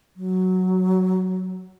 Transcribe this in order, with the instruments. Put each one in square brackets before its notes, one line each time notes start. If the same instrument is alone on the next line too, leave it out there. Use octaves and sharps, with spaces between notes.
[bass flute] F#3